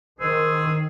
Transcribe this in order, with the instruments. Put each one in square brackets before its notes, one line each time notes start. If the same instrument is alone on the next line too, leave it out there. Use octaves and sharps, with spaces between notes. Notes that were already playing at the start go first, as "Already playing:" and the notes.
[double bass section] D#3 [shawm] G#4 [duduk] C5 [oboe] E6